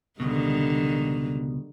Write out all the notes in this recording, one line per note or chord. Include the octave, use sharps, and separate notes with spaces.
C#2 B2 D3 D#3 G3